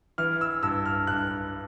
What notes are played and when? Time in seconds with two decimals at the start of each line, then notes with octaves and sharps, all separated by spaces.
0.18 E3 F6
0.41 E6
0.63 G2 E6
0.85 F6
1.07 G2 F#6